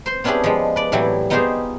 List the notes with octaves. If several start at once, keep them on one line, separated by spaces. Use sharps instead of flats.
C5 C6
B3 C#4 D4 E4 G4 G#4
F3 G#3
B4 D5
A2 E3 F#3 G3 E4
B3 D#4 F4 G4 G#4 C5